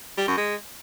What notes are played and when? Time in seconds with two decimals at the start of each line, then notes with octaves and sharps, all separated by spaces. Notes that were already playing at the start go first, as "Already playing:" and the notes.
0.17 G3
0.27 F#2
0.37 G#3